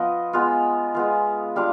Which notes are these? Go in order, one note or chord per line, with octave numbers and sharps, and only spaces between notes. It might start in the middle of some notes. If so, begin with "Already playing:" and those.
Already playing: F3 B3 F4 D#5
G#3 B3 F4
G#3 B3 F4
G3 D4 F4 F5